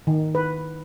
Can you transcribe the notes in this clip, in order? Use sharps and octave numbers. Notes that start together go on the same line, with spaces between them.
D#3
B4